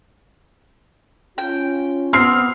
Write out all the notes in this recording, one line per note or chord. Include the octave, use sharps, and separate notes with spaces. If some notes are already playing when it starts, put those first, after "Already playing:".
C#4 F4 G5
B3 C4 F6 C7